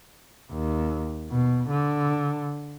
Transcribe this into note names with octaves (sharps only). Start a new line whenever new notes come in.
D#2
B2
D3